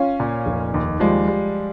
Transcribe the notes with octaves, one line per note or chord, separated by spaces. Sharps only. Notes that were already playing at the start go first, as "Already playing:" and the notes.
Already playing: C#4 F4
A#2
F1
D#2
F3 G3 G#3
G3